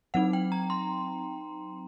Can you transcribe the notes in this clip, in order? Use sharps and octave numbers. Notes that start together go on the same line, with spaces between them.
F#3 C4 D#4 F#5
G5
A#5
C6